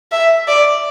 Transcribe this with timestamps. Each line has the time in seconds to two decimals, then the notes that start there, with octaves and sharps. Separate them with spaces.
0.12 E5
0.48 D5